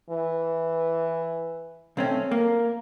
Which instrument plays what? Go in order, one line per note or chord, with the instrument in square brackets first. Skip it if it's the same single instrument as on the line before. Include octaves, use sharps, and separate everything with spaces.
[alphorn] E3
[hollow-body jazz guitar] B1 C4 C#4 [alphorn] A3
[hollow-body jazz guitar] A#3 [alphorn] A#4